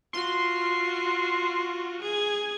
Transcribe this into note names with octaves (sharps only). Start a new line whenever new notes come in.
F4 F#4 C6
G#4 G#6